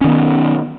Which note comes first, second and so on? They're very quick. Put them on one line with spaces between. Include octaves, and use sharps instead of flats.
C#4 D#3 B3